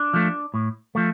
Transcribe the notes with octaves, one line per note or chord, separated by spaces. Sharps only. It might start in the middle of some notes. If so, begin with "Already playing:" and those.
Already playing: D4
F3 A3
A2
F3 A3